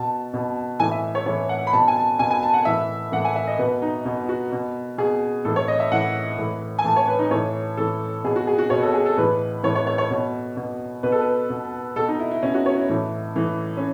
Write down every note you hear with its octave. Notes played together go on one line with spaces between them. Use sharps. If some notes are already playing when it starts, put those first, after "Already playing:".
Already playing: B2 A5
B2
A2 E3 G#5
E5
C#5
A2 E3 C#5
F#5
B5
B2 A5
G#5
A5
B2 G#5
G#5
A5
F#5
A2 E3 E5
A2 E3 F#5
G#5
E5
D#5
B2 B4
D#4
B2
F#4
B2
B2 G#4
A2 E3 A4
C#5
D#5
E5
A2 E3 F#5
A2 E3
G#5
A2 E3 A5
C#5
B4
D#4
A2 E3 C#5
A2 E3 A4
B2 G#4
F#4
G#4
F#4
B2 C#5
A4
G#4
A4
A2 E3 B4
A2 E3 C#5
C#5
C#5
C#5
B2
B2
B2 B4
A4
B4
B2
B2 A4
D#4
E4
E4
B2 C#4
F#4
C#5
E4
A2 E3
A2 E3
C#4